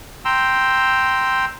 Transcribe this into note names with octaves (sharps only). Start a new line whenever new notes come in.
G5 A#5 C6 E6